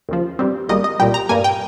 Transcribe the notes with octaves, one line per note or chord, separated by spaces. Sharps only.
D#2 C#3 F3
G2 G3 C4
G#1 G#2 G3 A#3 D#5
D#5
C2 A#2 G3 G5
A#5
G2 G3 A#3 G#5
G5